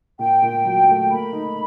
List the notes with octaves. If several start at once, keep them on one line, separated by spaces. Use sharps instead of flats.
A#2 G5
A#2
F#3
A3
A#3 B5
D#4